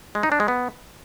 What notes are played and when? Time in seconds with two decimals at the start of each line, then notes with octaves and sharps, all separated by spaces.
0.15 G#3
0.23 D#4
0.32 D4
0.40 G#3
0.48 B3